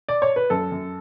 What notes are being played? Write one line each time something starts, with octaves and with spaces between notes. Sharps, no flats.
D5
C#5
B4
F#2 A4
F#2